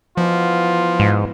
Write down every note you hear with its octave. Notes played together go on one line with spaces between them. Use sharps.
B2 E3 F3 F4
G#2